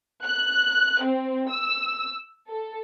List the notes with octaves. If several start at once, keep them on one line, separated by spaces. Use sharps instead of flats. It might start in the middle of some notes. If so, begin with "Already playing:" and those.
F#6
C4
E6
A4